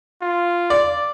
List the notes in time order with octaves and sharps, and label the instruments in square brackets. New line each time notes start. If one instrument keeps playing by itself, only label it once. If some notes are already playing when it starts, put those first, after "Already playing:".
[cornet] F4
[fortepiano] D5